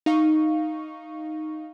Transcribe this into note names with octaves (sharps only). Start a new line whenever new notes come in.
D#4 F5 C#6